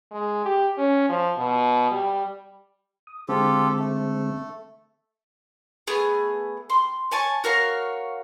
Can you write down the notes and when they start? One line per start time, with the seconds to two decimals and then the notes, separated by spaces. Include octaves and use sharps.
0.11 G#3
0.46 G4
0.78 C#4
1.09 F3
1.38 B2
1.91 G3
3.07 D#6
3.29 D3 G#3 C4 F4 G4 A4
3.80 A3
5.87 A3 B3 G#4
6.70 C6
7.11 C#5 G#5 A5 C#6
7.44 F#4 A#4 C#5 F5